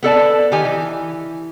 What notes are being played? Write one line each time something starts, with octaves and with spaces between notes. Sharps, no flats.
B3 A4 D5 A5
D#3 G4 G#5
E3